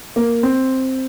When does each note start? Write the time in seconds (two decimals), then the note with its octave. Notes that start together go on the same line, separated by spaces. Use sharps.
0.16 A#3
0.43 C4